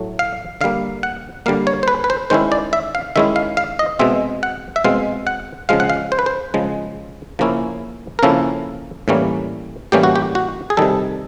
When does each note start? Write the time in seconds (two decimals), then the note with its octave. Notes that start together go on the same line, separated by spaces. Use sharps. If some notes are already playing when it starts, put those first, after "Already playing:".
Already playing: A2 F#3 A3
0.19 F5
0.61 D3 G3 A#3 F5
1.03 F#5
1.46 D3 G3 A#3 F5
1.67 C#5
1.83 C5
1.88 B4
2.04 B4
2.10 C5
2.30 D#3 G#3 C#4 E4 C5
2.52 D5
2.73 E5
2.95 F5
3.16 D#3 G#3 C#4 E4 E5
3.36 F5
3.57 F5
3.79 D#5
3.99 B2 G#3 C4 E5
4.43 F#5
4.76 E5
4.84 B2 G#3 C4 F5
5.27 F#5
5.69 C#3 F3 G#3 F5
5.80 F#5
5.90 F5
6.12 C5
6.19 B4
6.26 C5
6.54 C#3 F3 G#3
7.39 C#3 F3 A#3 C#4 E4
8.19 A#4
8.23 C#3 F3 A#3 C#4 E4 A4
9.08 A2 E3 G3 A#3 C#4
9.92 A2 E3 G3 A#3 C#4 G4
10.03 F#4
10.16 G4
10.35 F#4
10.70 G#4
10.77 C3 D#3 G3 A4